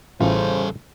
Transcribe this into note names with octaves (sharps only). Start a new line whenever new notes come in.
A1 C#3 E3 G3 F4 A4 C5